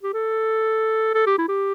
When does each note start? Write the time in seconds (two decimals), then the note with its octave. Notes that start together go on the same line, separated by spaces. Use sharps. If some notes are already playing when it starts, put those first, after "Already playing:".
0.03 G4
0.14 A4
1.15 A4
1.26 G4
1.38 E4
1.48 G4